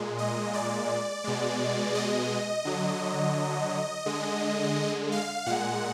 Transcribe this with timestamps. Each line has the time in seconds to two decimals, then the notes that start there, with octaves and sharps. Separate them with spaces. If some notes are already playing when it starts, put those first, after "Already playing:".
Already playing: A#2 G#3
0.18 D#5
0.54 D5
1.24 B2 G#3
1.95 D#5
2.65 D3 F#3
4.06 D3 G#3
5.12 F5
5.46 A#2 G#3 F#5